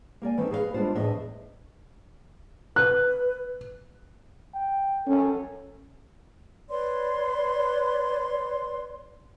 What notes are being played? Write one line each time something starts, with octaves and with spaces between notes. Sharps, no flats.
A#3 A#4 D5 G#5
E3 A3 C4 C#4 D#4
G#4 A#4 B4 C#5 F5
G3 G#3 B3 D4 F4 C5
E2 A2 D4 G#4 D#5 E5
B4 F#6
G5
C#4 A4
B4 C#5 D5 C6